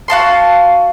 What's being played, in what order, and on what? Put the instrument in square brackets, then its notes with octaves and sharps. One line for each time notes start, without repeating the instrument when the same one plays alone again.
[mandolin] F#4 F5 A5 C6